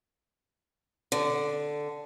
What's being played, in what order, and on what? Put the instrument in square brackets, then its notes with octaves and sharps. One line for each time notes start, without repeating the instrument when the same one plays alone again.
[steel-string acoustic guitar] D3